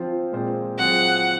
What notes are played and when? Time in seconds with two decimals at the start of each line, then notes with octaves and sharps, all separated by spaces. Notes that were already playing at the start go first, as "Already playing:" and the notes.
Already playing: F3 C4 F4 C5
0.32 A#2 G#3 C4 F4 C5
0.78 F#3 C4 F4 G#4 F#5